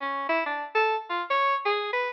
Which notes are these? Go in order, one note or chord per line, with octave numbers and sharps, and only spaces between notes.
C#4
E4
D4
A4
F4
C#5
G#4
B4